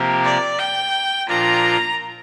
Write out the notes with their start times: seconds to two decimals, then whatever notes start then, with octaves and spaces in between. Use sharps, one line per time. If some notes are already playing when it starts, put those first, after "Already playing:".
Already playing: C3 F3 A#3 G4 A#4
0.24 D5
0.58 G5
1.28 A#2 F3 D4 F4 A#4 A#5